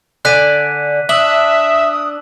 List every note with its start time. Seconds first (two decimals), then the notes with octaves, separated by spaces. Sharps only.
0.25 D3 D5 G#5 F#6 B6 D#7
1.09 D4 E5 D#6 E6 F#7